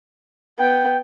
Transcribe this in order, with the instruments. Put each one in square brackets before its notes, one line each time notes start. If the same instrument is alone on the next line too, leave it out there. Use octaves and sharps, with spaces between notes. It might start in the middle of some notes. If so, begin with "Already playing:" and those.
[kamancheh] B3 [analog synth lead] G5